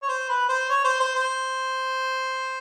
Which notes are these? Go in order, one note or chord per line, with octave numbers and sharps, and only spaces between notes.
C#5
C5
B4
C5
C#5
C5
C5
C5